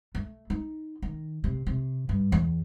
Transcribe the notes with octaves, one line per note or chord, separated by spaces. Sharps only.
A3
D#4
D#3
C3
C3
G2
E2